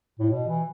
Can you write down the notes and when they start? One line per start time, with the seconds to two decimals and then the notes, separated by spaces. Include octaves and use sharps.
0.19 A2
0.30 B2
0.47 E3